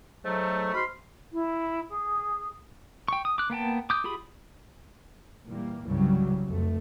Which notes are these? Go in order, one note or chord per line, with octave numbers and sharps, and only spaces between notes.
G#2 F#3 A3
G#2 F#4 B5 C6 F6
E4
G#4
G5 C#6
D#6
D6 F#6
A#3 B3 G5 A5
D6 D#6 G6
F4 G4 G#4 B5 D#6
A#2 E3 G3 A#3
C2 G2 C#3 E3 F#3 G3
F1 A3